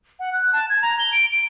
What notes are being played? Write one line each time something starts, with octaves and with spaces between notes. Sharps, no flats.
F#5
F#6
A5
G#6
A#5
G7
D7
D7